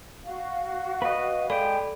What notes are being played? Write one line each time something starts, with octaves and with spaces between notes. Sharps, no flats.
F#4 F5
B4 D#5
G#3 A4 D5 G5 B5